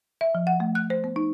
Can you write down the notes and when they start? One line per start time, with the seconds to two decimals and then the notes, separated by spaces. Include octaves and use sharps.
0.21 E5
0.35 F3
0.47 F#5
0.60 A3
0.75 F#6
0.90 C5
1.04 B3
1.16 D#4